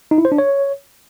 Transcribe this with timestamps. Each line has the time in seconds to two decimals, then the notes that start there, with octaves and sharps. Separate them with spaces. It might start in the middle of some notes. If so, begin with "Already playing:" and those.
0.11 D#4
0.18 E4
0.25 C5
0.32 D4
0.38 C#5